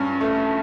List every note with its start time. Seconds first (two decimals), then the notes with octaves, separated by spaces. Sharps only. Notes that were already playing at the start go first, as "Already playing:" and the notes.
Already playing: G2 C#4
0.21 A3